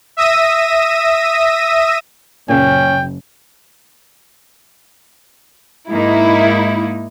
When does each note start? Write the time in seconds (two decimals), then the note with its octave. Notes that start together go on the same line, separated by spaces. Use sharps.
0.17 E5 D#6 E6 A#6 D#7
2.49 F#1 A#2 C#3 C#4 G5
5.89 G#2 A#3 D#4 E4